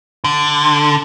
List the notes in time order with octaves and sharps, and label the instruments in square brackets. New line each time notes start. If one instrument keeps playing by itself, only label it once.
[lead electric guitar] D3